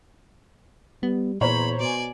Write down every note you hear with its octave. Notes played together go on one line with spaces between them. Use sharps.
G3 B3
E2 A#2 C5 C#5 A#5 B5
B2 D5 G#5